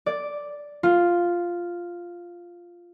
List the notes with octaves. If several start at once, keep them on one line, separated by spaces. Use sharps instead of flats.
D5
F4